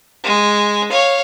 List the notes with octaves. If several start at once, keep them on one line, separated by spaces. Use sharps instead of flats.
G#3
C#5 F5